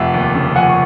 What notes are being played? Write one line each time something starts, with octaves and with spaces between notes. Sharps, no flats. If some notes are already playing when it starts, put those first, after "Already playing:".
Already playing: F1 E5 F#5
D#2
C#3
F3 F#5 G#5
C#6